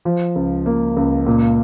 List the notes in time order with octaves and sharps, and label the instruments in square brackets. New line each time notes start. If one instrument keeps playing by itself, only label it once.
[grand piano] F3
C#2
A#3
C#2
A#2